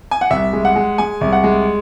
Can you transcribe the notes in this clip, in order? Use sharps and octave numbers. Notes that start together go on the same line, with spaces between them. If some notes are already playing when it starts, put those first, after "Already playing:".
G#5
F#5
C2 E5
G#3
F#5
G#3
G#3 G#5
C2
F#5
G#3